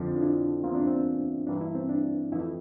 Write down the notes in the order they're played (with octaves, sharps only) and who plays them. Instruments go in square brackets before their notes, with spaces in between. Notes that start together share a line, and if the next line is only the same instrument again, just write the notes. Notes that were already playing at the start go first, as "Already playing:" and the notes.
Already playing: [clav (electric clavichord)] F2 D3 F3
[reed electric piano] D4
E4
[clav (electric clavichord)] E2 E3 A#3 F4 [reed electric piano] C4
[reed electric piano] D4
C4
[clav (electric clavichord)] G2 E3 A#3 [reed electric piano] D4
[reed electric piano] E4
C4
D4
[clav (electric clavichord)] F2 E3 A3 [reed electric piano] E4